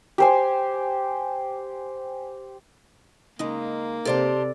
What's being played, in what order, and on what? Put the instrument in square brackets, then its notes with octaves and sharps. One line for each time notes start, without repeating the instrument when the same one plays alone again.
[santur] G4 C5 G#5
[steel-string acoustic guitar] C#3 G#3 [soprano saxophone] A#3 [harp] D#4
[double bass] C3 [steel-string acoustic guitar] G4 C5 A5 [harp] A4 D5